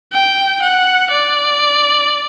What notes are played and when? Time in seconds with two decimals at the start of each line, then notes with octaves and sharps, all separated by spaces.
0.13 G5
0.62 F#5
1.11 D5